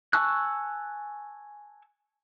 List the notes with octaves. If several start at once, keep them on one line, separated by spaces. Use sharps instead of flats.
G#5 A5 C#6 E6 F#6